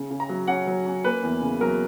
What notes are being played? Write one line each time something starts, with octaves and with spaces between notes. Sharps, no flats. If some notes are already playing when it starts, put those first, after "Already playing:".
Already playing: C#3
C#3
A#5
F#3
C#4 F#5
F#3
C#4
A#3 B4
E2
C#3
F#3 A#4